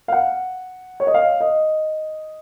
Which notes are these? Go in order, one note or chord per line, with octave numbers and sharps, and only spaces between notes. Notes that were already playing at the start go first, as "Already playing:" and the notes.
F5
F#5
C#5
D#5
F5
D#5